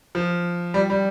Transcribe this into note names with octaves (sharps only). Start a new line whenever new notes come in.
F3
G3
G3